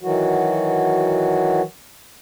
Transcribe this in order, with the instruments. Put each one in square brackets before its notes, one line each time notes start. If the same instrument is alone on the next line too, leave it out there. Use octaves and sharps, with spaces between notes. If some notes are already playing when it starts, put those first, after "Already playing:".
[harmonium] D#3 E3 F#3 F#4